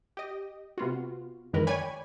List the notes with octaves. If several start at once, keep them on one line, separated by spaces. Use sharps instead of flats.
G4 D#5
C3 B3 F4 F#4
F#2 D#3 E3 G#3 A#4 B4
C#5 D5 G5 G#5 B5